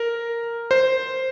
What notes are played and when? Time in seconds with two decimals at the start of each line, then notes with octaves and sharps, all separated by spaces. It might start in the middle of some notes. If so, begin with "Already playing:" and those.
Already playing: A#4
0.71 C5